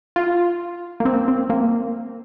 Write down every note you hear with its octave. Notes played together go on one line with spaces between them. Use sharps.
F4
A#3
C4
C4
A#3